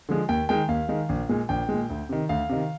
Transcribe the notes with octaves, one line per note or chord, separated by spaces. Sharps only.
D3 F3 G#3
D#2 G5
D#3 G#3 G5
D#2 F5
D#3 G#3
A#1
A#2 G#3
A#1 G5
A#2 G#3
D2
C3 D#3
D2 F5
C3 D#3